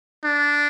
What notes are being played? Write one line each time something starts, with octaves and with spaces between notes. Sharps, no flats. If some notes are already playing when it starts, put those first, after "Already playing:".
D4